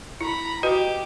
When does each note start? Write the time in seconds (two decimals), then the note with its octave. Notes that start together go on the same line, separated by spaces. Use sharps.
0.21 E4 A#5 B5
0.63 F#4 G4 B4 D#5